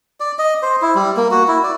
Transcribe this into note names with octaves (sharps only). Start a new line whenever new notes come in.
D5
D#5
C5
E4
G3
A#3
F#4
E4
D5